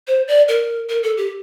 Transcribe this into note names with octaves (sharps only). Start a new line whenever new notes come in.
C5
D5
A#4
A#4
A4
G4